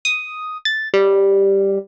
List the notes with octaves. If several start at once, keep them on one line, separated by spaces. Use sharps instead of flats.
D#6
A6
G3